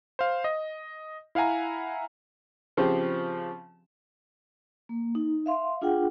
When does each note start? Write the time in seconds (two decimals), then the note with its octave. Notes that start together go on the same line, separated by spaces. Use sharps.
0.19 C5 F5
0.44 D#5
1.35 E4 F5 F#5 G#5 A#5
2.77 C#3 F3 C4 G4
4.89 A#3
5.15 D#4
5.46 E5 F5 C6
5.82 D4 F4 G#4 F#5 G5